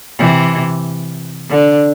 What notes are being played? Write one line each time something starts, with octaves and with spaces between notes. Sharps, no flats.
C3 E3
D3